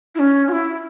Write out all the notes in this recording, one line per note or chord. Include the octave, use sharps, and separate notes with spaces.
E4
C#4
F#4
E4